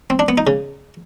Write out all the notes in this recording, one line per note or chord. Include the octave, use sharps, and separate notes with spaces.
C4
D4
B3
D#4
C#3